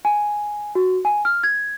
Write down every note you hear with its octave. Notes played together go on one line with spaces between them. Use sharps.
G#5
F#4
G#5
F6
G#6